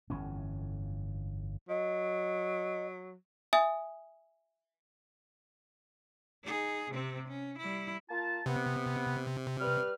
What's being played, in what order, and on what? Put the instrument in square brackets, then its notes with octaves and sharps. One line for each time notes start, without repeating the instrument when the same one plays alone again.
[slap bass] G1 F2 E3 C#4
[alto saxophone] F#3 [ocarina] D#5
[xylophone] E5 G#5 D#6
[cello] D#4 G#4
C3 C4
C#4
G3 E4
[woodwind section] A#3 F4 A5
[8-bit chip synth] C3 [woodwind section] B3
[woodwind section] G3 B4 F6